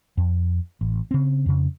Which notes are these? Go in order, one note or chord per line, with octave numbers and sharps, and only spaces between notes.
F2
A1
C#3 C4
F2 C#3